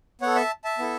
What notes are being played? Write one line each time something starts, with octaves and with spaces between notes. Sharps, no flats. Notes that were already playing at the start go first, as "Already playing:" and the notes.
B3 A4 C#5 F#5
E5 A5
E5 A5
B3 E4 A4